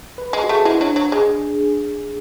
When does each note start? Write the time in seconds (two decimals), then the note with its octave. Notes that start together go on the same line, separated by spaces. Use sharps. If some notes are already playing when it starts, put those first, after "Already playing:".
0.18 B4
0.33 G#3
0.43 F#4
0.48 A3 G#4
0.65 G#3 E4
0.81 F#3 D4
0.96 F#3
1.12 G#3 G#4